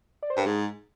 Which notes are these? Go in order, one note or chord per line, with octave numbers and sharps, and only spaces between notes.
D5
C5
G2 A#4
G#2 G#4